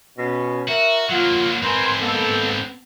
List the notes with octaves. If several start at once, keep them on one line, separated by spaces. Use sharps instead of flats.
B2 C#4
F#4 A#4 E5
F#3 A#3 F4 F#5
G#2 C4 A#4 B4 G#5 C6
A#3 B3 A4